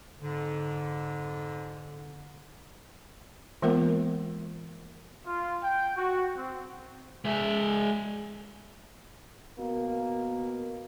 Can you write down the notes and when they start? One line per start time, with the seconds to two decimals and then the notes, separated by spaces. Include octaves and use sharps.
0.21 F2 G#2 D3
3.62 E3 G#3 A#3 B3 F4 A#4
5.25 F4
5.63 G5
5.95 F#4
6.36 C4
7.25 G#3 E5
9.59 B2 A#3